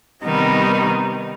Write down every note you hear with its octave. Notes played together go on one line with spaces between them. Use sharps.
C3 D#3 G3 B3 D#4